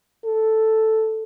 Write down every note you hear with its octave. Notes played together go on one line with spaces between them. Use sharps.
A4